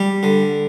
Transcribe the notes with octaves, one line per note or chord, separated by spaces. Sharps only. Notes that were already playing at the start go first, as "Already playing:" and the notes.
Already playing: G3
D3